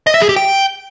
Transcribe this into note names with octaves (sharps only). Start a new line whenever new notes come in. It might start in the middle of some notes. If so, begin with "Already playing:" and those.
D#5
E5
G#4
G4
G5